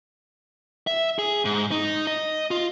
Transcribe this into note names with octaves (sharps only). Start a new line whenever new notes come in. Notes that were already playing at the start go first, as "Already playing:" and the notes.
E5
G#4
G#2
D#4
D#5
F4